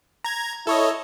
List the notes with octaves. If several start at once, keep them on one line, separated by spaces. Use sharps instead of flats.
A#5 G#6
E4 A4 C#5 D#5